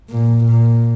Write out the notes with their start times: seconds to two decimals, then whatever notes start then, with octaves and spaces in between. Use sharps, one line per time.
0.10 A#2
0.45 A#2